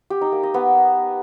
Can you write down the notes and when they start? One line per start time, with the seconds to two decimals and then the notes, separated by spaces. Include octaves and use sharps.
0.10 G4
0.21 D#4
0.32 A#3
0.43 D#5
0.54 B3